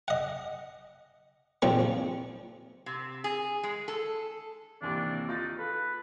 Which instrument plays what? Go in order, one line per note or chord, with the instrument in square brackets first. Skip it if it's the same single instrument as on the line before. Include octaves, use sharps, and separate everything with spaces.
[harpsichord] D#5 F#5
A#1 D#2 F3 C4 C#6
[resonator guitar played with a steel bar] C3
G#4
G#3
A4
[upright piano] D#2 C3 E3 [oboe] D4
[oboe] D#4 [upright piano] F4 A6
[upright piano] A4 [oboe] B4